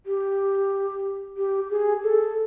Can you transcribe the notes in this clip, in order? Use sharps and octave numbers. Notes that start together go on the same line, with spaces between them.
G4
G4
G#4
A4